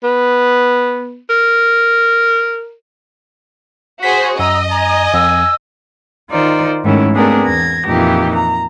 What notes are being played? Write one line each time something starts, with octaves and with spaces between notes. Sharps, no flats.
B3
A#4
F#4 G#4 C5 B6
F#2 D#5 A#5 E6
G#5 A#5
F2 E6
D#3 D#4 F4 C5 D5
G#2 D#3 A3 C#4 E4
A3 B3 C4 D4 G#4 A#4
E2 G#6 A#6
F2 A#2 E3 D#4 G4
A#5